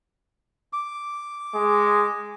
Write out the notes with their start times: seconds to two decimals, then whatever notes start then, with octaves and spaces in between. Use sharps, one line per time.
0.73 D6
1.54 G#3